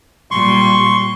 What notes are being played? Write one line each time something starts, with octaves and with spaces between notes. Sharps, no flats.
A#2 G3 C6 C#6